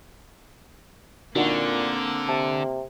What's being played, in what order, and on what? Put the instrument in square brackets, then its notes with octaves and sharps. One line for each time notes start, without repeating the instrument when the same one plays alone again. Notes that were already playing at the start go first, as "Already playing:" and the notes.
[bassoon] A#2 [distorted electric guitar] D3 [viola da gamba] A#3 C4 [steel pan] D4 D#4 F#4
[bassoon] C3 [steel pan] A5